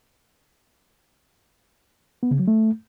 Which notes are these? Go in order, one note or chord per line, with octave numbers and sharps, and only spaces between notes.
B3
C#3
F#3
A3